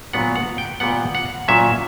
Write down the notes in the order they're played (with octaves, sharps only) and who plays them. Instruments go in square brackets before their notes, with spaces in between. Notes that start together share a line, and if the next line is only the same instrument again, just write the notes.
[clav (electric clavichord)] A#2 F#3 B3 D4 F#5
F#5
G5
A#2 G3 B3 F#5
F#5
A#2 F#3 C#4 E5